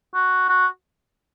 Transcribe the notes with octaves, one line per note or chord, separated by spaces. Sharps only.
F#4
F#4